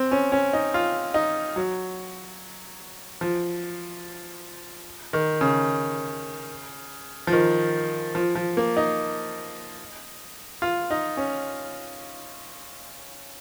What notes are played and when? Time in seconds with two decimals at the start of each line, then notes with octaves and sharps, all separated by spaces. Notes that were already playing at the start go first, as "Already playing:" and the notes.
Already playing: C4
0.11 C#4
0.32 C#4
0.53 D#4
0.74 F4
1.14 D#4
1.56 F#3
3.21 F3
5.13 D#3
5.41 C#3
7.27 F3
7.32 D#3
8.15 F3
8.35 F3
8.57 A#3
8.77 D#4
10.62 F4
10.91 D#4
11.17 C#4